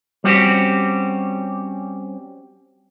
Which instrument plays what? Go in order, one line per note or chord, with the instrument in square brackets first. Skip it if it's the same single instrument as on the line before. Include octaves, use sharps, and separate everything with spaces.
[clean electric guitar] G3 C4 C#4 F#4 G4